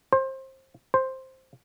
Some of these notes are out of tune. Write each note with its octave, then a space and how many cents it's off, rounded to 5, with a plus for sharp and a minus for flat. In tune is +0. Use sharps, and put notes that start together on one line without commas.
C5 +25
C5 +5